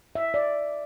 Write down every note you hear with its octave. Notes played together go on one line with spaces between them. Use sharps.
E5
D5